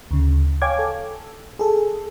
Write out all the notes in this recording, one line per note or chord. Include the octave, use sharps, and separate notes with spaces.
D2 C#3
C#5 F5 G5 G#5 D6 G#6
A4
G#4 A4